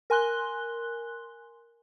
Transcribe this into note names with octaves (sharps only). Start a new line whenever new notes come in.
A#4 G#5 C6 F#6 G7